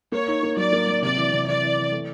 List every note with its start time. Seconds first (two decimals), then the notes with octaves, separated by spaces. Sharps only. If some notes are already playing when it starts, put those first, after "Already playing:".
0.12 A#3 C#5
0.28 D#4
0.43 A#3
0.57 F#3 D5
0.73 A#3
0.87 F#3
1.02 C3 D5
1.17 E3
1.32 C3
1.47 E3 D5
1.63 E3
1.78 E3
1.92 A3